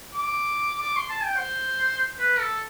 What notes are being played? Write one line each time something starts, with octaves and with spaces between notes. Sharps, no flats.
D6
D6
C6
A5
G5
C5
B4
A4